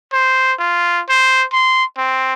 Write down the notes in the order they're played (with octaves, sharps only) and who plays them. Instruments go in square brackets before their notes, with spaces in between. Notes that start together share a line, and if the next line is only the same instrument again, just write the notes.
[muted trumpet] C5
F4
C5
C6
C4